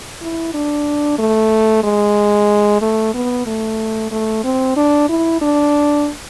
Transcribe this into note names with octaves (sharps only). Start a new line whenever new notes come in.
E4
D4
A3
G#3
A3
B3
A3
A3
C4
D4
E4
D4